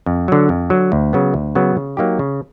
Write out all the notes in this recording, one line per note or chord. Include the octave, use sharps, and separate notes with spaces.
F2
D3 F#3
F2
D3 F#3
D2
C#3 F#3 B3
D2
C#3 F#3 B3
C#3
F#3 A#3 D#4 G4
C#3